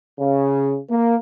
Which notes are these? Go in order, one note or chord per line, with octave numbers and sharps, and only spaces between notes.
C#3
A#3